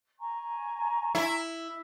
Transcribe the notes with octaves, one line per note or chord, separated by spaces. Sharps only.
G#5 A#5 C#6
E4